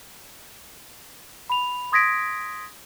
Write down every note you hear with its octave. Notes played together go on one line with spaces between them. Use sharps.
B5 F7
C6 D#6 G#6 A#6 B6 D7